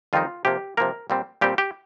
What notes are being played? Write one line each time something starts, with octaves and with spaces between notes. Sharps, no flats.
F2 D#3 G3 C4 D#4 F4
C3 F3 A#3 G4
C3 F3 A#3 A#4
A#2 G3 C4
A#2 G3 C4 G4
G4